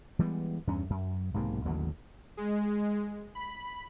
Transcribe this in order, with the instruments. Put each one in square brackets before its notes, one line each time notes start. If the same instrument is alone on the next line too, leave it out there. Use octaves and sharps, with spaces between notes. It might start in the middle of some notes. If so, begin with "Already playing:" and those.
[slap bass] E3 G3 G#3 B3
E2 G2 C#4
F#2
B1 G#2 C3 A#3
A1 D#2 D3 F#3
[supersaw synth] G#3
B5